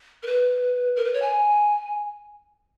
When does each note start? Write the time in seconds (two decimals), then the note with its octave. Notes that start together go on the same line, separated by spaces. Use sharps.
0.23 A#4
0.26 B4
0.96 A#4
1.05 B4
1.14 C#5
1.22 G#5